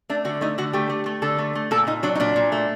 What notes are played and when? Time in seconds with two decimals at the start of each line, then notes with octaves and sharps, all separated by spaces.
0.09 A3 D4
0.25 D3 F#4
0.41 A3 D#4
0.58 D3 F#4
0.73 A3 G4
0.90 A3
1.06 A3
1.22 D3 A4
1.38 A3
1.55 A3
1.71 A#2 A4
1.87 A#2 D#4
2.03 F#3 D4
2.15 D#4
2.20 A#2 D4
2.36 A#2
2.52 A3